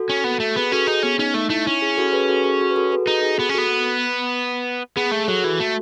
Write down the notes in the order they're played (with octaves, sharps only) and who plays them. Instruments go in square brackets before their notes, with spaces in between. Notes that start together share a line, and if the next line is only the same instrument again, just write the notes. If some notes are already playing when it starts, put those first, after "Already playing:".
Already playing: [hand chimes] F#4 A4
[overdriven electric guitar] C#4
B3
A3
[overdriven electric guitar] B3 [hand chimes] G#4 B4
[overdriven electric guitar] C#4 [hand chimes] F#4 A4
[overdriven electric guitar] D#4 [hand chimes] G#4
[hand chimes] B3 [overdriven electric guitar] C#4
[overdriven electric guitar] C#4 [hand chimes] D#4
[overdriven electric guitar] A3 [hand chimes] D#4
[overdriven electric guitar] A3 [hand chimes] E4
[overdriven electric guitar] C#4 [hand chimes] E4
[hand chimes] G#4
F#4 A4
G#4 B4
F#4 A4
G#4
F#4
B4
F#4 A4
G#4 B4
[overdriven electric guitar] D#4 [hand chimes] F#4 A4
[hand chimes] G#4
[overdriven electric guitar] B3
C#4
[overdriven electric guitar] B3 [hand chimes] F#4 A4
[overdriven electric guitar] B3 [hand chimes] G#4
[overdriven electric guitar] A3 [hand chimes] G#4
[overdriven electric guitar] F#3 [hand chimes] F#4 A4
[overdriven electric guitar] E3 [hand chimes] F#4 A4
[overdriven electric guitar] A3